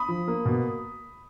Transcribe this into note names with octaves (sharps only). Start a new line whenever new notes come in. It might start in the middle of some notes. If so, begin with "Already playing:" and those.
Already playing: B5 D#6
F3
A#3
B2